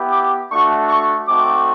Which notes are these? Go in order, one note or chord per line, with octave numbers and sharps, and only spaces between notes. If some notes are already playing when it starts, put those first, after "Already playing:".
Already playing: B3 E4 G4
D6
A3 D4 F#4 C#6
C#6
A3 C4 D#4 F#4 D6